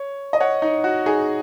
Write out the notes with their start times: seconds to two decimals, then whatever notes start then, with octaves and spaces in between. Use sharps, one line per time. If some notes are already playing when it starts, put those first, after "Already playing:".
Already playing: C#5
0.33 D#5
0.40 C#5 F#5
0.62 D#4
0.84 F#4
1.06 D#4 G#4